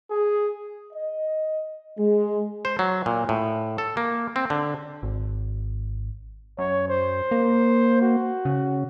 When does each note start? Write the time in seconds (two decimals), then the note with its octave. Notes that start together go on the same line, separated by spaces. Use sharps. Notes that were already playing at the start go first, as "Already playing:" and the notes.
0.11 G#4
0.93 D#5
1.98 G#3
2.65 C5
2.79 F#3
3.06 A#2
3.29 A2
3.78 A4
3.97 A#3
4.36 C4
4.50 D3
5.03 G#1
6.58 F#2 C#5
6.89 C5
7.31 A#3
8.01 F#4
8.45 C#3